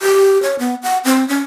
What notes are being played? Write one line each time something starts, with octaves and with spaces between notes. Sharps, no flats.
G4
C#5
B3
F#5
C4
C#4